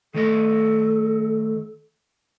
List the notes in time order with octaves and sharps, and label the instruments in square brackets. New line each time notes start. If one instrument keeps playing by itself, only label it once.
[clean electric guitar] D#3 A3 D#5 [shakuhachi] A4